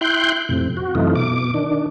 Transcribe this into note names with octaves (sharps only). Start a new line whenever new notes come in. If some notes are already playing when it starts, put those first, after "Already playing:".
E4 G5 C6 F#6 G6
F2 A2 C3
F#4
F#2 C3 E3 A3 D#4 F4
B2 D6
D#3 D4